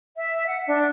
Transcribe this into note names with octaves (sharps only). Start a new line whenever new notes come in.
E5
F#5
D4